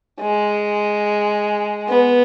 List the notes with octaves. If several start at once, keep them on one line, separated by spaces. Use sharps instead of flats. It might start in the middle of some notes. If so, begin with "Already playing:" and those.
G#3
B3